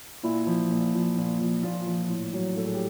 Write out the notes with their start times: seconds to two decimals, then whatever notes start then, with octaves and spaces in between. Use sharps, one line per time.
0.23 A#2 E4
0.47 F3
0.70 A#2
0.94 F3
1.17 A#2
1.40 F3
1.63 A#2 F4
1.87 F3
2.09 A2
2.33 F#3
2.56 A2 A4
2.65 G#4
2.74 G4